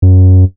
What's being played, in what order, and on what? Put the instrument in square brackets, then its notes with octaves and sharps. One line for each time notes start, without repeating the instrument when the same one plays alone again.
[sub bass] F#2